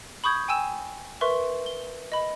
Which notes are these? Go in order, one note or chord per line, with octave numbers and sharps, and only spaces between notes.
B5 C#6 D#6 G6 G#6
G5 G#5 E6 E7
A#4 B4 E5 C6 C#6
G7
D#5 B5